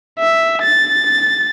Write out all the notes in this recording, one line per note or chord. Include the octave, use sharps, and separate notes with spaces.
E5
A6